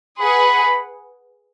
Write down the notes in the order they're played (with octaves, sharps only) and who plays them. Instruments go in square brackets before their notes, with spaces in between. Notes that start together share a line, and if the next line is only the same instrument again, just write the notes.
[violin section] G#4 B4 F#5 [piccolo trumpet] B5